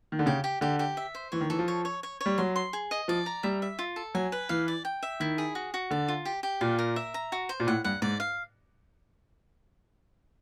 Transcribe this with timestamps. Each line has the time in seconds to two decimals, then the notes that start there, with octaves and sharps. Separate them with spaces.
0.12 D#3
0.19 D3
0.26 C#3 G4
0.44 G4
0.61 D3 G4
0.79 G4
0.97 E5
1.15 C5
1.32 E3 C#5
1.41 D#3
1.50 E3 A4
1.59 F3
1.68 C#5
1.85 C#5
2.03 C#5
2.21 C#5
2.26 G3
2.38 F#3 C6
2.56 C6
2.73 G#4
2.91 D#5
3.08 F3 D5
3.26 A#5
3.43 G3 E5
3.62 E5
3.79 F4
3.96 A4
4.15 F#3 G#5
4.32 B4
4.49 E3 F5
4.68 D5
4.85 G5
5.03 E5
5.20 D#3 E4
5.38 G#4
5.55 F#4
5.74 F#4
5.91 D3 D5
6.08 F4
6.25 G4
6.43 G4
6.61 A#2 F5
6.79 A#4
6.96 E5
7.14 A#5
7.32 F#4
7.49 C5
7.60 A#2
7.67 A2 F#5
7.84 G2 F#5
8.02 G#2 D5
8.20 F5